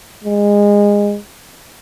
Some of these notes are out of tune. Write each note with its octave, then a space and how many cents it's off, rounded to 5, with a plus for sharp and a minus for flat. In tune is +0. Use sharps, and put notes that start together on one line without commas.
G#3 -20